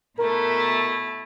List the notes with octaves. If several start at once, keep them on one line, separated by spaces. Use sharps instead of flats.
B2 A3 E4 A#4